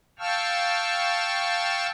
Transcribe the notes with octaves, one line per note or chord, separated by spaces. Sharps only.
F5 G5 A5 C#6 E6 F6